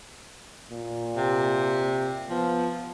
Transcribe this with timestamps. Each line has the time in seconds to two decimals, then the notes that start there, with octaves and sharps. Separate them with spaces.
0.71 A#2
1.17 C3
2.30 F3 B3